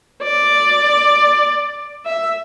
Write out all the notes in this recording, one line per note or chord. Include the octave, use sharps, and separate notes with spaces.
D5
E5